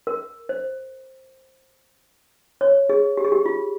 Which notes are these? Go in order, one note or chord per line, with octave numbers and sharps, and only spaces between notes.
A#4
C5
C#5
G#4
G4
G#4
G4
F4